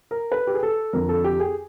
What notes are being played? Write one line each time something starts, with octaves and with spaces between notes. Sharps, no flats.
A#4
B4
G4
G#4
A4
F2 D3 F3 A#4
A4
G4
G#4